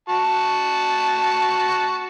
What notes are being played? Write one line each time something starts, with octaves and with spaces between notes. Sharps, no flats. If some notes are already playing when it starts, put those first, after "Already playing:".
F#4 A5